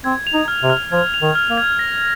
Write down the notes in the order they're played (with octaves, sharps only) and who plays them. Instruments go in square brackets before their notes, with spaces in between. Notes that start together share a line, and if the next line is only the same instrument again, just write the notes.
[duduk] C4 [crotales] G#6
[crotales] F7
[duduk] D#4
[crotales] F6
[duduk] C3
[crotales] F6
[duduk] F3 [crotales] G#6
[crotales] F7
[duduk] D#3
[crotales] F6
[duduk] A#3
[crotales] G#6
A#6